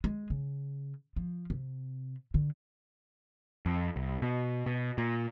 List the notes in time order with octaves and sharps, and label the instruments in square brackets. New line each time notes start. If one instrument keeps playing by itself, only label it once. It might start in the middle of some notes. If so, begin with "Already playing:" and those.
[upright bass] G#3
C#3
F3
C3
D3
[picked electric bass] F2
C2
B2
B2
A#2